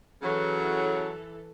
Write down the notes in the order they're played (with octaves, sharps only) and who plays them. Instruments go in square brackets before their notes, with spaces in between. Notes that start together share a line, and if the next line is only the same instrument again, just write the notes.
[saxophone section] C#3 F#3 [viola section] E3 A4